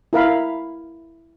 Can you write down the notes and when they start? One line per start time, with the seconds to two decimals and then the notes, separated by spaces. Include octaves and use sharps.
0.13 E4 A#4 F5 B5